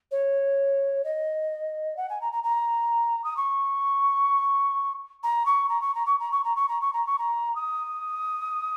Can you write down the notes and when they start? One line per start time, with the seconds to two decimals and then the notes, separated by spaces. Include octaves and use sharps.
0.11 C#5
1.04 D#5
1.96 F#5
2.09 G#5
2.21 A#5
2.32 A#5
2.43 A#5
3.24 D#6
3.37 C#6
5.23 A#5
5.45 C#6
5.69 A#5
5.81 C#6
5.94 A#5
6.05 C#6
6.19 A#5
6.31 C#6
6.44 A#5
6.55 C#6
6.68 A#5
6.81 C#6
6.93 A#5
7.06 C#6
7.18 A#5
7.55 D#6